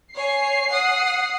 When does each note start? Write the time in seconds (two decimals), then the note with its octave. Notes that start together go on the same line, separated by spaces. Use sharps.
0.14 C#5 G#5 C7
0.68 F#5 D#6